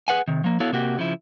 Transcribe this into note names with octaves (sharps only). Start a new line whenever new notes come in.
G#4 B4 F#5 G#5
C3 D#3
F3 A#3
B3 E4 F#4 A4 C#5 F5
C3 A#3 F#4 G4
C#3 F3 E4